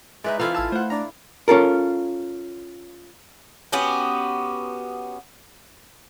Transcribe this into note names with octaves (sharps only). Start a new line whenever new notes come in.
G#3 D#4 B4 D5 E5
E3 C4 E4 F4 A4 F5
A1 G#5 A5 E6 F6
A3 C5 F#5
D4 A#5
C#4 F4 A4 A#4
B3 C#4 F#4 G4